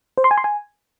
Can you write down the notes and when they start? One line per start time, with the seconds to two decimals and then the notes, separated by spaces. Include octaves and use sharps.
0.18 C5
0.24 C6
0.31 G#5
0.38 C6
0.44 G#5